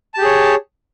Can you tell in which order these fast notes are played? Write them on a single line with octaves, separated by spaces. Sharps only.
A5 G4 G#4 C#5